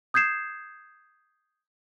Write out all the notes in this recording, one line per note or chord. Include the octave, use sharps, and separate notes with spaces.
D#6 G6 G#6 C7 E7